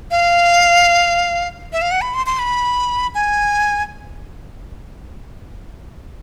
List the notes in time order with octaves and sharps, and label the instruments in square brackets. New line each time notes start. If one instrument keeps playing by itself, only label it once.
[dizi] F5
E5
F5
F#5
B5
C6
C6
B5
G#5